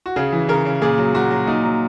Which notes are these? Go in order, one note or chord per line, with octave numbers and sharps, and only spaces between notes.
F#4
C#3 G#4
E3
C#3 A#4
C#3
A#2 G#4
F#3
A#2 F#4
F#3
A#2 D#4
F#3